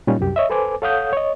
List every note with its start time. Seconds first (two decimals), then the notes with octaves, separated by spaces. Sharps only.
0.07 A#2 G3 C#4 D#4 F4
0.19 C2 F#2 G4
0.36 C#5 D#5 E5
0.50 A4 B4 C5 G#5 D6
0.82 A4 C#5 F5 F#5 D#6 G6
1.13 C#5 D#5